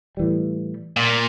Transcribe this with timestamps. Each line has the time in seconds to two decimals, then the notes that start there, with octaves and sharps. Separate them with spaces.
0.17 A2 E3 G3
0.97 A#2